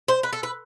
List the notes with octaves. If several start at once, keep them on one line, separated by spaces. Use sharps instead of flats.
C5
B4
A4
B4